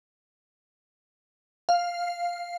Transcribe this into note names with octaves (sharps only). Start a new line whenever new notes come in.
F5